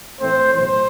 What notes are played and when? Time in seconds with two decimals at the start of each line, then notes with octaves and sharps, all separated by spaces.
0.21 A2 E3 A3 C4 C5
0.52 B1 A2 E3 C5